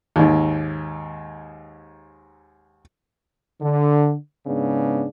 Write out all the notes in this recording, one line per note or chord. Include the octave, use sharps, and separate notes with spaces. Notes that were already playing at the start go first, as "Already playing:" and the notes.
D#2 G#2
D3
G#2 C#3 B3 D4